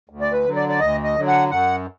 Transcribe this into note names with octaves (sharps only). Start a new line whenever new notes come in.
D2
D5
B4
D3 F#3
D5
D5
D2 D#5
D#5
D3 F#3
F#5
F#2 F#5